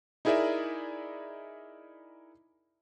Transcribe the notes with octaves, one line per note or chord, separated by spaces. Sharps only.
D#4 E4 G#4 A#4 D5 E5